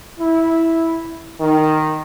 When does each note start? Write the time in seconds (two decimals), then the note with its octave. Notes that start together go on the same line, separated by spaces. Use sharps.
0.19 E4
1.41 D#3